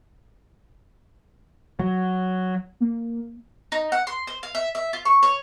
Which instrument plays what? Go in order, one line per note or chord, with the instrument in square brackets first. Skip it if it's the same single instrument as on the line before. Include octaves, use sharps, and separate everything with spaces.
[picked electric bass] F#3
[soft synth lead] A#3
[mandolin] D#4
F#5
C6
C5
F5
E5
E5
F4
C#6
C#5